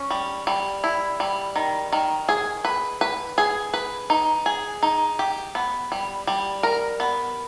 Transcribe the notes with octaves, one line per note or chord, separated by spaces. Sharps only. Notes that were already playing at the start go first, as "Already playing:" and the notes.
Already playing: C#4
G3
G3
E4
G3
D#3
D#3
G#4
B4
B4
G#4
B4
D#4
G#4
D#4
G4
B3
G3
G3
A#4
B3